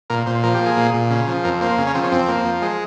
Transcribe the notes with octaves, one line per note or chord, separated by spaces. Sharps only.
A#2 A#4
A#2 C5
F3 A#4
G4
A#3
G#4
A#2
A#2
C#3
F3
F2 A#4
A#3 C5
C#3
C#4
F3 C4
C#4
F2 C4
A#3
F3
G#3